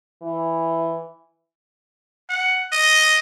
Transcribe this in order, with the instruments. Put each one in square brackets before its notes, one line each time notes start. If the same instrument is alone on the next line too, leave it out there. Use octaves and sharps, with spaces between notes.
[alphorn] E3
[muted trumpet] F#5
D#5